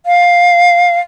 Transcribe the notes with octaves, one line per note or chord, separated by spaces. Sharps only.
F5